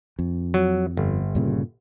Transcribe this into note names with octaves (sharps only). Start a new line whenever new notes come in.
F2
F#3
G1
G2 A#2 C#3